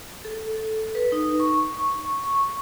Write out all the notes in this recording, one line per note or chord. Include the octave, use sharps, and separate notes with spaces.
A4
B4
D#4
C#6
C#6